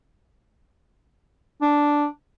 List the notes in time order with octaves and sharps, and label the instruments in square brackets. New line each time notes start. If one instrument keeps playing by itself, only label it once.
[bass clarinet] D4